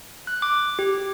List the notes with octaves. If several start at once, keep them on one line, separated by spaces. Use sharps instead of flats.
F#6
D6
G4